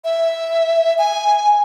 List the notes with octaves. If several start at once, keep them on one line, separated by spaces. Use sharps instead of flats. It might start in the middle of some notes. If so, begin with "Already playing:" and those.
E5
G#5